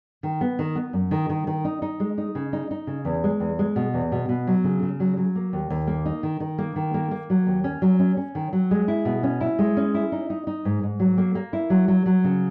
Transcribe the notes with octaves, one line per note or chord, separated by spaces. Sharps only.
D#3
B3
D#3
B3
F#2
D#3
D#3
D#3
D#4
D#4
G#3
D#4
C#3
D#4
D#4
C#3
E2
G#3
E2
G#3
B2
E2
B2
B2
F#3
C#3
C#3
F#3
F#3
A#3
D#2
D#2
A#3
D#4
D#3
D#3
A#3
D#3
A#3
A#3
F#3
D#2
C#4
F#3
C#4
C#4
D#3
F#3
G#3
E4
B2
C#4
E4
G#3
C#4
E4
D#4
D#4
D#4
G#2
G#2
F#3
A#3
A#3
E4
F#3
F#3
F#3
C#3